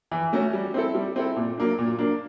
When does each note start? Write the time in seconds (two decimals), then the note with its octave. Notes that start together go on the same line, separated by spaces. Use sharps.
0.11 E3
0.33 A3 C#4 F#4
0.53 G3
0.74 C4 E4 A4
0.95 G3
1.16 C4 E4 A4
1.36 A#2
1.57 F#3 A#3 D4
1.79 A#2
1.99 F#3 A#3 D4